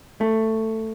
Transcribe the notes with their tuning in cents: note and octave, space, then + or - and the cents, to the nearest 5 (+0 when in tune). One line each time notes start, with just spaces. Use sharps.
A3 +10